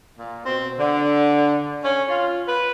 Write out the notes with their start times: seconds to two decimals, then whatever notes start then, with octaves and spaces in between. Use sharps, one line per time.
0.16 A#2
0.44 B2 C4
0.78 D3
1.83 C#4
2.08 F4
2.47 B4